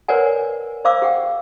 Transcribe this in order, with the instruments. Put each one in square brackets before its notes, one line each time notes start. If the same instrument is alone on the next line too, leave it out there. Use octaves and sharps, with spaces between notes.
[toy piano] A#4 B4 C#5 D5 F#5 G#5
C5 D5 F5 C#6 D6 E6
G#4 F#5 G5